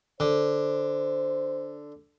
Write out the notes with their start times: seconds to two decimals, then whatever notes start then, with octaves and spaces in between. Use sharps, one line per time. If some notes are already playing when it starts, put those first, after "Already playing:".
0.20 D3 C5